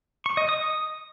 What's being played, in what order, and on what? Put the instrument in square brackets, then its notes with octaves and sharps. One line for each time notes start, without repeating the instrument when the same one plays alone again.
[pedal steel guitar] C#6
D#5
D#6